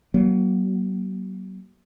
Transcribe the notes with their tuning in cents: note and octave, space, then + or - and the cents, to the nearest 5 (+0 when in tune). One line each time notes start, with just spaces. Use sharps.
F#3 +35 A#3 +35